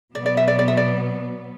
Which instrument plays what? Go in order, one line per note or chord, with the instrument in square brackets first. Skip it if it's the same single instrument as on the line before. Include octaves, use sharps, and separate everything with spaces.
[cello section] B2 F#3 B3 [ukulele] D5
[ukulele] D5
E5
D5
D5
E5
D5